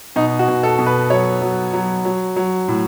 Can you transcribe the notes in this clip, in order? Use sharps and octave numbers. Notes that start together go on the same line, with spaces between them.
B2 D#4
F#4
B2
A4
B2
B4
F#3 C#5
F#3
F#3
F#3
F#3
A2